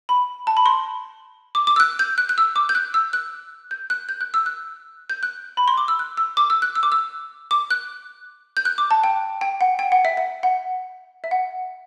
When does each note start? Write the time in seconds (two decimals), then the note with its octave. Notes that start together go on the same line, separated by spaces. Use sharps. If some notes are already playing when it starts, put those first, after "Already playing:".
0.09 B5
0.47 A5
0.57 B5
0.66 C6
1.55 D6
1.67 D6
1.76 E6
1.80 F#6
1.99 G6
2.18 F#6
2.29 F#6
2.38 E6
2.56 D6
2.69 G6
2.75 F#6
2.94 E6
3.13 F#6
3.71 G6
3.90 F#6
4.09 G6
4.21 F#6
4.34 E6
4.46 F#6
5.10 G6
5.23 F#6
5.57 B5
5.68 C6
5.78 D6
5.88 E6
5.99 F#6
6.17 E6
6.37 D6
6.50 E6
6.62 F#6
6.75 E6
6.83 D6
6.92 E6
7.51 D6
7.70 F#6
8.57 G6
8.65 F#6
8.78 D6
8.91 A5
9.04 G5
9.41 G5
9.61 F#5
9.79 G5
9.92 F#5
10.05 E5
10.17 E5
10.43 F#5
11.24 E5
11.31 F#5